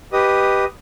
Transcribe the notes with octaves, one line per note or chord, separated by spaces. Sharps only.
G4 B4 D#5 D#6